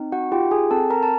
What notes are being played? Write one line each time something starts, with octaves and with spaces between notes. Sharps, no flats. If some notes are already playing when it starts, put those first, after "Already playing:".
Already playing: C4 D#4
F#4 F#5
F4 G4 G5
G#4 G#5
C4 A4 A5
A#4 A#5
A5